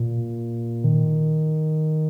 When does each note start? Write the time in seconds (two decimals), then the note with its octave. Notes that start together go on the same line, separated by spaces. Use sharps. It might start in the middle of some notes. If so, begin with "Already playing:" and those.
Already playing: A#2
0.84 D#3